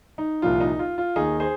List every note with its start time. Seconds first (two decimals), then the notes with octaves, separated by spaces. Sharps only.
0.18 D#4
0.42 C2 A#2 F3 F4
0.60 D#4
0.79 F4
0.98 F4
1.16 D#2 D#3 D#4 G#4
1.40 G#4 C5